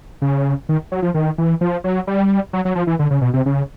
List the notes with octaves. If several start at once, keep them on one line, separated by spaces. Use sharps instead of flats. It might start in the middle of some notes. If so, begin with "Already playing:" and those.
C#3
D#3
F#3
F3
D#3
E3
F3
F#3
G3
F#3
F#3
F3
E3
D3
C#3
B2
C3
C#3